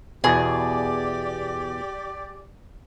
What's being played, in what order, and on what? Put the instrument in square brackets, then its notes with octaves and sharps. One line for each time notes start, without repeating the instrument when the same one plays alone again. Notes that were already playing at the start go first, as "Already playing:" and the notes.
[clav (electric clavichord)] E2 B2 [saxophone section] G4 D5 [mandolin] G#4